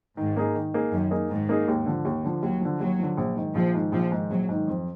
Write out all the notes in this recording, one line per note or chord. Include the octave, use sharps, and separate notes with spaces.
G#2 D#3
A#3 D#4 G#4
D#3
A#3 D#4 G#4
F#2 D#3
A#3 D#4 G#4
G#2 D#3
A#3 D#4 G#4
D#2
D3 F3
D#2
D3 F3
D#2 F#3
D3 F3
D#2 F#3
D3 F3
A#1
G#2 D#3
A#1 F3
G#2 D#3
A#1 F3
G#2 D#3
A#1 F#3
G#2 D#3
F2